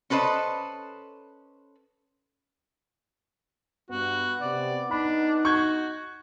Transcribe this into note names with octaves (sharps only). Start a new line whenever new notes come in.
C#4 A4 B4 C5 D#5
G2 B3 F#4
C3 D5
D4 D#4 B5
F#4 C#6 G6 G#6